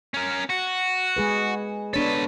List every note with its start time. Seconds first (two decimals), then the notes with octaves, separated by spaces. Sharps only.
0.14 C#4 A#4
0.50 F#4
1.16 G#3 G#4 B4
1.94 B3 D4 A4 B4 C#5